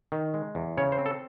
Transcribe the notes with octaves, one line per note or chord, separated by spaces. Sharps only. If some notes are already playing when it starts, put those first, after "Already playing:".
D#3
G#3
E2
C#3 C#5
C5
C4
A4